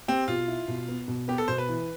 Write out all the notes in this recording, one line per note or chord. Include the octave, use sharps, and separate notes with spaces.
C4 G4
B2 F4
E4
B2
B3
B2
B3 G4
A4
B2 C5
B4
E3